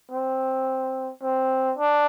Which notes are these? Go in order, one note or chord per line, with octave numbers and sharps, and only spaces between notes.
C4
C4
D4